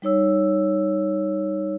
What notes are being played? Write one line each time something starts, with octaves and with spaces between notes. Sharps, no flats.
G3 D#4 C#5 E6